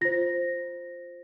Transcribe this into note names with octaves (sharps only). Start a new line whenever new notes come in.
F4 C5 A#6